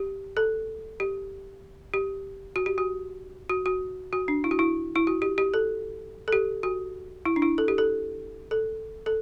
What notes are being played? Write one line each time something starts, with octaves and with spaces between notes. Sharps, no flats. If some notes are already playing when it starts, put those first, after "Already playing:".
Already playing: G4
A4
G4
G4
F#4
G4
F#4
F#4
F#4
F#4
D4
E4
F#4
E4
E4
F#4
G4
G4
A4
A4
G4
F#4
E4
D4
E4
A4
G4
A4
A4
A4